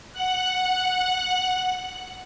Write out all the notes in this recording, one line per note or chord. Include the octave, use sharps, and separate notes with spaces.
F#5 F#6